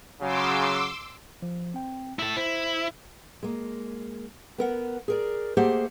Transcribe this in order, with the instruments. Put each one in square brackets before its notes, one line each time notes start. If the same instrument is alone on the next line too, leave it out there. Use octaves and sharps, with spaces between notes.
[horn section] C#3 F#3 [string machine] C6 D6 E6
[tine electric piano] F3
C4 G5
[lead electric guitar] E4 A4
[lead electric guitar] E4 [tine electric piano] C5
[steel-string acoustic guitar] G#3 A#3
B3 A#4 F#5
G#4 A#4 D5
A3 A#3 G4 G#4 C5 F#5